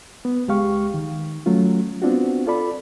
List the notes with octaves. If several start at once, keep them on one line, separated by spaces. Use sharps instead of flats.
B3
C#2 G#3 G4 F5 C#6
D#3
F#3 A3 C#4 F4
B3 C4 D4 F4 F#4
F4 A4 D5 B5